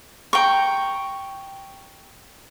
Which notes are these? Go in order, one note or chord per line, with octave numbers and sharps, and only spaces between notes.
G5 A#5 C#6